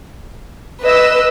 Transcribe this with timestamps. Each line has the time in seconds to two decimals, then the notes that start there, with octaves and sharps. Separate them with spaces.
0.84 B4 D#5 E6